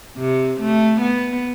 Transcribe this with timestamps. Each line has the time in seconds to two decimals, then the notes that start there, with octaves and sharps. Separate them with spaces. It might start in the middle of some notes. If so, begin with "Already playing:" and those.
0.18 C3
0.60 A3
1.01 B3